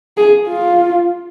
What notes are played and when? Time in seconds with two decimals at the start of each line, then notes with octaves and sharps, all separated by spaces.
0.17 G#4
0.48 F4